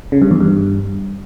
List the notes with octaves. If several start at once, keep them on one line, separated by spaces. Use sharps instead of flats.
C#3
G2
E2
G2